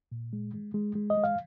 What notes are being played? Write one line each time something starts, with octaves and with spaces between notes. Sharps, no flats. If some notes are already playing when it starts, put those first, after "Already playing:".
A#2
G#3
G#3
G#3
G#3
D#5
G#3
F5